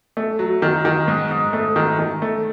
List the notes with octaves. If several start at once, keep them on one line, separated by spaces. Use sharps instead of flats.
A3
F#3
D#3
D#3
G#2
G#2
A3
D#3
D#3
A3